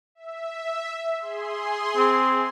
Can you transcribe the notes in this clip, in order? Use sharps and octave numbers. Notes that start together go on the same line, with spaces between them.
E5
G#4 C6
C4